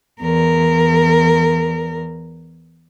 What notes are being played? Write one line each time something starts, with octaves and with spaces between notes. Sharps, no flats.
E2 A#4